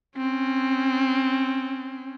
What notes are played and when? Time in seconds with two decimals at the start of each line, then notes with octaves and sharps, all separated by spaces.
0.17 C4 C#4